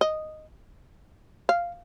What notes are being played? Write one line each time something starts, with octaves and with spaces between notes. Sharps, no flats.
D#5
F5